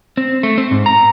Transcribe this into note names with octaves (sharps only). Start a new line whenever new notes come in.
C4
A3
C4
G#2
A#5